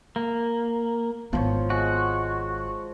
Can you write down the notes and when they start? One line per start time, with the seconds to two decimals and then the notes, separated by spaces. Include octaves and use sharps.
0.16 A#3
1.33 G#1 F3 B3 C#5
1.70 G#3 F#4